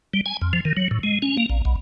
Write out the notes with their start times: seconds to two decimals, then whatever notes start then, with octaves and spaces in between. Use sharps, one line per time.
0.14 G3
0.26 G#5
0.42 F2
0.53 F3
0.65 D#3
0.77 F#3
0.91 A2
1.03 G#3
1.22 C#4
1.37 A#3
1.50 A#1
1.65 B1